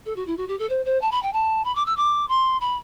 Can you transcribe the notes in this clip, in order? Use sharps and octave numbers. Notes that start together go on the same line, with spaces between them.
A4
F#4
E4
F#4
G4
A4
C5
C5
A5
B5
G5
A5
B5
D6
E6
D6
C6
B5